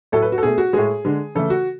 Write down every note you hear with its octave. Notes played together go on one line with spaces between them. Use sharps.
A2 F#3 A3 A4
B4
F#4
A4
B2 A3 G#4
F#4
A2 G#3 G#4
D3 G#3
C#3 E3 A3 A4
F#4